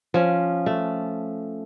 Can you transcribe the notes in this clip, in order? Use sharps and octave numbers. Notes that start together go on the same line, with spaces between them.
F3 C#4
A3